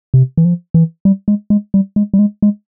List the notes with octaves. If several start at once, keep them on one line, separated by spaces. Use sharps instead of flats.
C3
E3
F3
E3
G3
G#3
G#3
G3
G#3
G3
G#3
G#3